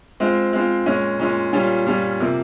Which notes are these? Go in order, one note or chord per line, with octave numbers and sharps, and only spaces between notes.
G#3 C4 F4
G#3 C4 F4
A#2 G#3 C#4
A#2 G#3 C#4
A#2 G3 C#4 F4
A#2 G3 C#4 F4
C3 F3 A#3